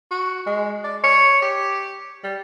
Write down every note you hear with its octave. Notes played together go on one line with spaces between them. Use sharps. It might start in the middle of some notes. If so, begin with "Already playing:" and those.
F#4
G#3
D5
C#5
G4
G3